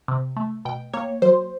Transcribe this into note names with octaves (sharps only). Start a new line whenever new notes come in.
C3
A3
B2 G5
A#3 C#5
F#3 C5